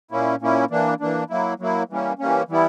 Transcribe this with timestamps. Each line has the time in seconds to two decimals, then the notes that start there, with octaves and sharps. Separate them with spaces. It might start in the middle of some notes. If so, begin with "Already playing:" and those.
0.11 A#2 A#3 C#4 E4
0.41 A#2 A#3 C#4 E4
0.71 E3 A#3 D4
1.00 E3 A#3 D4
1.30 F#3 A#3 E4
1.60 F#3 A#3 E4
1.89 E3 G3 A#3 C#4
2.19 E3 G3 A#3 C#4
2.49 E3 G3 B3 E4